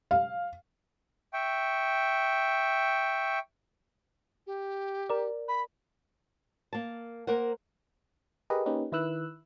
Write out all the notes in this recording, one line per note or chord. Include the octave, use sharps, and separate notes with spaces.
F5
E5 G5 C#6
G4
A#4 D5
B5
A#3 A5
A#3 A#4 C5 F#5
G4 G#4 A#4 B4 D#5
A#3 C#4 D#4 G4 B4
D#3 E4 B4 E6 F#6